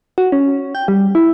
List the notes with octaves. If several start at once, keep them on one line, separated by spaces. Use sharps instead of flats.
F#4
C#4
G5
G3
E4